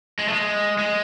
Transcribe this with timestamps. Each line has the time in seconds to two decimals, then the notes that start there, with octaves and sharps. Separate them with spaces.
0.19 G#3
0.28 A3
0.33 G#3
0.79 G#3